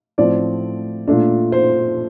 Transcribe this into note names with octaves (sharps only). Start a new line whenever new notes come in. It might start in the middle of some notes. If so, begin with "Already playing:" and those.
A2 F3 C4 D5
A#2 A3 D4
C5